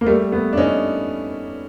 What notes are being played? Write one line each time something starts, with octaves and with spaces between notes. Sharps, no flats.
A#3
G3 A3
A3 B3
D4
C#4 D#4